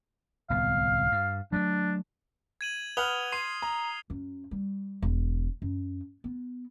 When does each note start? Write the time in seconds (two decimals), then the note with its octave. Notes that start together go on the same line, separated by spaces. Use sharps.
0.50 D1 C2 B3 F5
1.12 G2
1.52 F#3 G3 A3 D4
2.61 G#6 D#7 F#7
2.97 B4 F#5 D#6 F6 F7 G7
3.32 C6 C7 D#7
3.62 A#5
4.10 F#2
4.51 G3
5.02 E1
5.62 F#2
6.24 B3